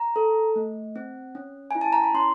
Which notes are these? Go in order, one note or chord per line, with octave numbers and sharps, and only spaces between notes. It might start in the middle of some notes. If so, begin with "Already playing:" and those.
Already playing: A#5
A4
A3
C4
C#4
E4 G#5
A5
A#5
B5
C#4 C6